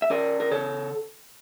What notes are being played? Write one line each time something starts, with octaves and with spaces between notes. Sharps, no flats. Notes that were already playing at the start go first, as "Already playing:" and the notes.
E5
C#4 A#4 D5
A#4
C#3 A4 C#5